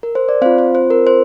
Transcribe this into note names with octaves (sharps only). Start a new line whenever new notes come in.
A#4
C5
D5
C4 F4 C5 F5
C5
C5
A#4
C5